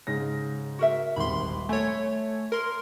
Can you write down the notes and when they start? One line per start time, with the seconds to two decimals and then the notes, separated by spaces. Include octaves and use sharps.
0.07 G#2 C#3 A#6
0.79 F#4 A#4 E5
1.16 D#1 G#1 B5 C6
1.69 A3 A4 C#5 G#5
2.52 A#4 C6